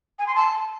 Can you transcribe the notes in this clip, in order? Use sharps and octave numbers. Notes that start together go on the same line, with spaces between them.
G#5
C6
A5